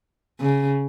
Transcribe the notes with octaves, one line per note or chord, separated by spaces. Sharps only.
C#3